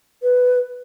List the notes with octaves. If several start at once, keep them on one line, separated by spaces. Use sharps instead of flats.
B4